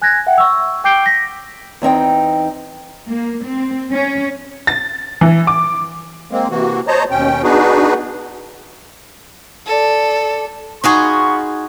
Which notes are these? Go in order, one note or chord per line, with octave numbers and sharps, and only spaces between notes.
G#5 F#6 G#6 A#6
E5 F#5 G5
C#6 E6
G5 D6 G6 C7 D7 G7
A#6 B6
E2 C4 D#4 G5
A#3
C4
C#4
A6
E3
D6
G#3 A#3 C4
C3 E3 A#3 F#4
C5 C#5 D#5 A5 A#5
D#2 B2 C#4 G5
B3 D4 D#4 F#4 G#4 B4
A4 D5
B3 D#4 F4 F#4 G#4 C#6